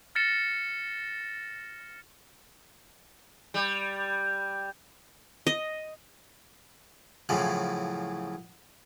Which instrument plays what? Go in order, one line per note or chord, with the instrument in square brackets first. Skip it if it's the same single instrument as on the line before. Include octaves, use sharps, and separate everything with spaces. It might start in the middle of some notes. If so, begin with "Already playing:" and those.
[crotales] F6 A6 A#6 C#7 E7 G7
[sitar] G3
[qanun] D#5
[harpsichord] F#2 A2 C#3 E3 F3